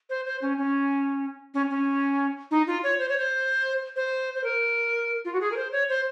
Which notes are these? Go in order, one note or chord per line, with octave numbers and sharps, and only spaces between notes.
C5
C5
C#4
C#4
C#4
C#4
D#4
F4
C#5
C5
C#5
C5
C5
C5
A#4
F4
F#4
G#4
A#4
C5
C#5
C5